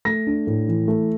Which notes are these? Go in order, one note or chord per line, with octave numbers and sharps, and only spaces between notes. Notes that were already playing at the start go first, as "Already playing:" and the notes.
A3 A#6
D4
A2
E3
A3